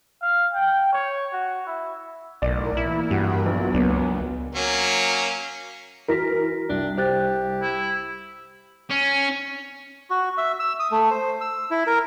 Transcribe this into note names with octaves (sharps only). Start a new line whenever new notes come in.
F5
G5
C#5
F#4
E4
B1 A2 A#4 D5
E3 A#3 E4
G2 G3 F#4 A#4 B5
A#1 F#3 B3
C#2 A#3 D4
F#3 A#3 C#4
E3 F#4 A#4 A#6 B6
C2 D4
G4 C5 F#6 A6
E4
C#4
F#4
E5
E6
D#6
A3
C5
E6
E4
A#4